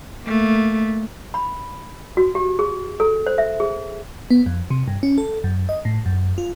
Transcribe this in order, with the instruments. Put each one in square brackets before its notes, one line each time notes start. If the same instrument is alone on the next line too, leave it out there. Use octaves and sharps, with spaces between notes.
[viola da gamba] A3 A#3
[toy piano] B5
F#4
G4
G#4
A4
C5
E5
G#4
[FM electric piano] B3
F2
C3
G2
C#4
A4
F#2
D#5
A2
F#2
F4